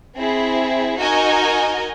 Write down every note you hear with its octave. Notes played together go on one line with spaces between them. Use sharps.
C4 E4 G#4
D#4 F#4 A#4 D#5 G#5